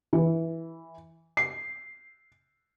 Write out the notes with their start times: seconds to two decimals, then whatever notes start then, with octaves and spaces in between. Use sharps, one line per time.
0.13 E3
1.37 C7